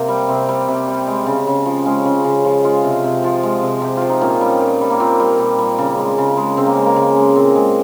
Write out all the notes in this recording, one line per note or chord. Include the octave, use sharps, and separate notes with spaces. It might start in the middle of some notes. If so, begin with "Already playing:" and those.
Already playing: C3 A#3
G3
C3 C4
G3
C3
G3
G#3
C#3
C#3
F3
G#3 C#4
C#3
C#3
F3
G#3 F4
C3
C3
F3
G#3
C3
C3 G4
F3 F4
D#4
A#2 C#4
G3
A#2
G3
A#3
A#2 C4
G3
A#2
G3
C#3
G#3
C#3
G#3
C#3 C4
A#3
G#3
A#3
C#3
G#3
A#2 C4
G#3